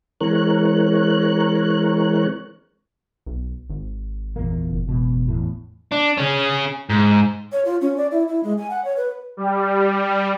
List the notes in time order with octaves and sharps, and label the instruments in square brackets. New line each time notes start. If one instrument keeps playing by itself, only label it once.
[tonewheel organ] E3 G#3 C4 A#4 C#5 F#6
[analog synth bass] B1
G#1
[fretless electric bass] E2 A#2 A#3
[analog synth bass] F#1
[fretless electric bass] E1 B2
E2 A2
[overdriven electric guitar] D4
C#4 G#4
G#2
[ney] C#5
F4
C#4
D5
E4
E4
G#3
G#5
F#5
C#5
B4
[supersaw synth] G3